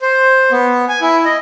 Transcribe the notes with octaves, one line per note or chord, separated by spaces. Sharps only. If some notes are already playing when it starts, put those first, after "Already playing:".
C5
B3
G#5
E4
D#5